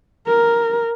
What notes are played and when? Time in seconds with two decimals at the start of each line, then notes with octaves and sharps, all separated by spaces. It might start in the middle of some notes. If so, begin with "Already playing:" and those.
0.27 A#4